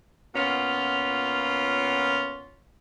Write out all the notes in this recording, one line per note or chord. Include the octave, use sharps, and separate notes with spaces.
A#2 B3 C#4 F4